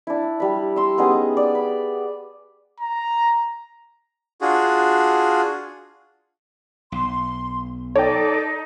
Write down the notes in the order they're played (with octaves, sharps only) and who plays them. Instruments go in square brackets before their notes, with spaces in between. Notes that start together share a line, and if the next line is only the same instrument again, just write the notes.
[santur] D4 E4
G3 B5
A#5 C6 E6
B3 C#4 D#4 G#4
D5
B5
[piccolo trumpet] A#5
[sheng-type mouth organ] D4 F4 F#4 G#4
[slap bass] B1 [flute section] C6
[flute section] D#4 [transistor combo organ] A4 D5 [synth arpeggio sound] C#5 G5